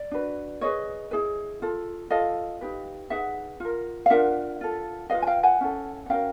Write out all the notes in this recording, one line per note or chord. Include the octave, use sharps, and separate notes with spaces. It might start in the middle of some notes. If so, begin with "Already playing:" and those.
Already playing: D5
D4 F#4 B4
E4 G#4 B4 C#5 D#5
E4 G#4 B4
F4 A4
F4 A4 D#5 F5
D#4 G4 B4
D#4 G#4 B4 E5 F#5
F4 A#4
F5
D4 F4 A#4 E5 F#5
F4 A4
F4 G#4 B4 D#5 F5
G#5
F5 G5
F#5 G#5
C#4 E4 A4
F#5
C#4 F#4 A#4 F5 G5